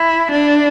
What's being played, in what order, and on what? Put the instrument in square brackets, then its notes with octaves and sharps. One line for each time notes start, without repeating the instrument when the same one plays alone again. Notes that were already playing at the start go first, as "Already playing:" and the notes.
Already playing: [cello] E4
D4